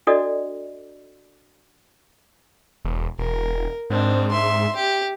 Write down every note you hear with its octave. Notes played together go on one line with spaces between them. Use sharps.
D4 F#4 A4 D5 D#5
E1
E1 A#4
G#2 C4 D4
E5 C6
G4